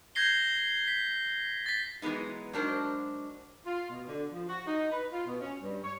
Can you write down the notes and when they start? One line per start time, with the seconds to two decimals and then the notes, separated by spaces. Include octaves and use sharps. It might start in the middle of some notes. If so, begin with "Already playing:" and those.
0.15 G6 G#6 A#6 C7 G7
0.88 B6
1.66 A6 B6
2.02 E3 F#3 G#3 B3 D#4
2.53 G#2 F#3 D4 F#4 A#4 C5
3.66 F4
3.89 B2
4.07 D3
4.32 F3
4.49 F#4
4.67 D#4
4.91 B4
5.12 F4
5.26 B2
5.42 C#4
5.61 G2
5.84 C#5